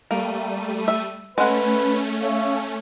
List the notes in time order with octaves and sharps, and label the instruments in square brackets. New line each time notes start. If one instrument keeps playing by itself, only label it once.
[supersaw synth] G3 A3 D#7 [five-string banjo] A#3
[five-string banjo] E5
[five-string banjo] G#3 F#5 [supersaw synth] A3 C#4 [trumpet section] B4
[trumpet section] C#5 E5 F5